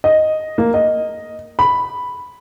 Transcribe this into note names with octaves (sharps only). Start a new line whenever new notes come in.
D#5
A#3
D#5
B5